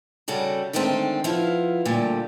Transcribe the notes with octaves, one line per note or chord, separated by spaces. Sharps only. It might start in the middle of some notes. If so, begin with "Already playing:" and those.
C#3 G3 F#4 A4
D3 D#3 G#3 A3 C4
F3 B3 E4 F5
A#2 D3 G3 A3